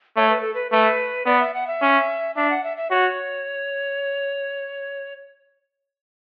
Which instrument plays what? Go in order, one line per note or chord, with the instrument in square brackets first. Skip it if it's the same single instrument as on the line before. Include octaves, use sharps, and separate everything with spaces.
[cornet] A3 [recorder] C#5
[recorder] B4
A4
B4
[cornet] A3 [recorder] B4
[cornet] B3 [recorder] D5
[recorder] E5
F#5
E5
[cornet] C#4
[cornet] D4 [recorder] E5
[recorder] F#5
E5
E5
[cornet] F#4 [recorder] C#5